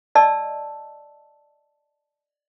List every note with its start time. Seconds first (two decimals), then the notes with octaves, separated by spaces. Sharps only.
0.15 D5 D#5 A5 E6